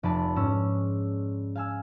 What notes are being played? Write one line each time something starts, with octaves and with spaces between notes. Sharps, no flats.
F1 B4 D5 A5
G#2 C#4 E6
F5 G#5 E6